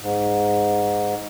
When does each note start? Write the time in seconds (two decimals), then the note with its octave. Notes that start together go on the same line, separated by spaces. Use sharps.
0.02 G#2